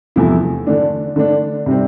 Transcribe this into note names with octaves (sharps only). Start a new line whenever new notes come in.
E2 C3 F3 A3 E4
D3 A3 D4
D3 A3 D4
C3 G3 C4